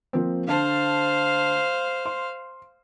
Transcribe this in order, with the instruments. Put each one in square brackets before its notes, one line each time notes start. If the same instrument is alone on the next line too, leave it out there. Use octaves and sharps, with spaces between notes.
[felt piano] F3 A#3 C4
[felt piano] D3 A5 [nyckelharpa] C5 F5
[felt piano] C6